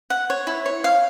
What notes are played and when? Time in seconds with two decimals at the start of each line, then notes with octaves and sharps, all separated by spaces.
0.10 F#5
0.30 C#5
0.47 E4
0.66 C#5
0.84 F5